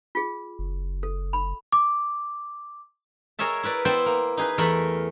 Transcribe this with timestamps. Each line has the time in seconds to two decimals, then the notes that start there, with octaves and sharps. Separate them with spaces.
0.15 F4 G#4
0.59 F#1
1.03 A4
1.33 B5
1.72 D6
3.39 G#4 A#4 C#5 D#5 E5 A5
3.63 E4 A#4 B4 D5
3.85 B3 E4 C5 D5 G5 A5
4.06 A#3
4.37 D#4 G#4 B4
4.58 E2 A3 A4 A#4 B5